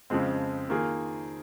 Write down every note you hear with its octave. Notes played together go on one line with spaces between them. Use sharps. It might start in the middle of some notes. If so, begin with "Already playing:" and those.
F2 C#3 F3 G#3 C4
D#3 A#3 F4 G#4